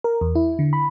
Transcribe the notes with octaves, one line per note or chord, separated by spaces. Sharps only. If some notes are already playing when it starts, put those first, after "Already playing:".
A#4
E2
E4
D3
B5